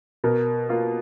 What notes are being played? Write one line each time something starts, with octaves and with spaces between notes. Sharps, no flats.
B2 A#4
A#3 F4